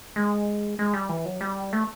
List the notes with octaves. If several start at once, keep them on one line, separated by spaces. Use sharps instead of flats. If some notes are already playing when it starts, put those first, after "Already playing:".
G#3
G#3
G3
E3
F#3
G3
A3